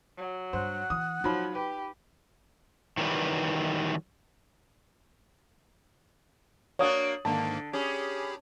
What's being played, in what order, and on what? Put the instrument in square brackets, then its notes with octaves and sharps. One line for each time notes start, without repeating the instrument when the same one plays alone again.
[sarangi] F#3
[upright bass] G2 [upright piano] C5 [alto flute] F#5
[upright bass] E3 [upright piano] D#6
[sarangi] F3 [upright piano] F#3 B5 [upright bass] D#4
[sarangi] G4 [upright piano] B4
[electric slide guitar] D#3 E3 F#3 G3 B4
[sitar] A#3 D4 F#4 [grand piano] C#5 D#6
[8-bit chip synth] G#2 D#3 A#3 [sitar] D3 [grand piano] A5
[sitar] C#4 [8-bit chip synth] G4 G#4 B5